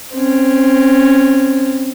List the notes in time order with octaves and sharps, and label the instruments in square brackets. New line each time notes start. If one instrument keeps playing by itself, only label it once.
[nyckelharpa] C4 C#4